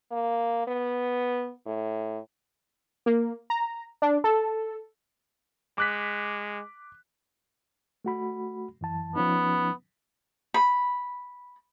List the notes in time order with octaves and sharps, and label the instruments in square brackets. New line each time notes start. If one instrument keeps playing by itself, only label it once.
[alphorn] A#3
B3
A2
[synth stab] A#3
A#5
D4
A4
[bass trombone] G#3 [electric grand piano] D6 F#6 B6
[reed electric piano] A3 F#4 B5
F#2 E3 A5
[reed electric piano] F3 C#4 D#4 [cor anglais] B3
[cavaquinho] B5